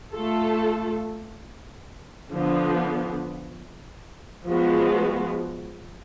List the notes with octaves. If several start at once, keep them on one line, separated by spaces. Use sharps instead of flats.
A3 F4 A4
D3 F3 B3
F3 G#3 B3 F#4